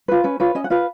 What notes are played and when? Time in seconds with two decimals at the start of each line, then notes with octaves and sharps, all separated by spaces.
0.08 F4 B4
0.24 C#4 B4
0.40 F4 B4 C#5
0.55 C#4 D#5
0.64 F#5
0.70 F4 B4 F5